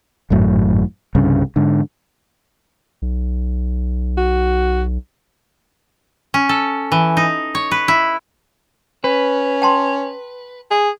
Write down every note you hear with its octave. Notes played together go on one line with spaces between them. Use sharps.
G#1 F#2 A2 F#3
C2 G2 C#3
G#2 D3
B1
F#4
C#4
A4
E3
D#4
C#5
B4
E4
C#4 B4
G5 A5 C6
G#4